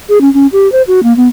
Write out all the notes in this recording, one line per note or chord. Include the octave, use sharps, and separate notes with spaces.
G#4
C#4
C#4
G4
C5
F#4
A#3
B3